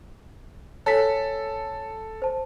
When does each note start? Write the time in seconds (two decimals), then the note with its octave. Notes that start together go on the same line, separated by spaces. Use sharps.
0.86 A4 C#5 G#5 B6
2.22 C5 A5